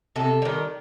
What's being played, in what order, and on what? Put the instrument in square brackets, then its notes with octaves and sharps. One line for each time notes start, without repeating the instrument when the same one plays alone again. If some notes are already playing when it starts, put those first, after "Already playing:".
[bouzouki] C3 A4
D#3 G3